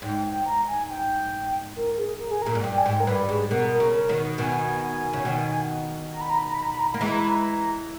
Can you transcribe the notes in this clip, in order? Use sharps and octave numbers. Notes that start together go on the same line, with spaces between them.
G#2 G5
G5
A#5
G#5
G5
A#4
G#4
A#4
G#4
A#2 A#4
G#2
G2 G5
G#5
G#2 G5
A#4
G2 B4
G#2 G#4
B2 A#4
A#4
C#3
A#4
B2 D#3
B2 D#3 G#5
C#3
B2 D#3
A#5
B5
A#5
B5
A#5
B5
A#5
B5
A#5
B5
A#3 A#5
E3 G#3 B5
A#5
B5
A#5